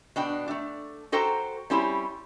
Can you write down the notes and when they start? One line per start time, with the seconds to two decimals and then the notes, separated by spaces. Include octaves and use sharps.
0.16 B2 D4 G5
0.48 A3 D4
1.12 F#4 A4 C5 G5 A#5
1.70 G3 C4 C#4 E4 G4